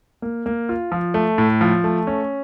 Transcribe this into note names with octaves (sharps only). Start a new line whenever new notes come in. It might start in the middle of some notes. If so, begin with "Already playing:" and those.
A#3
A#3
F4
F3
A3
A2
F3
A3
C#4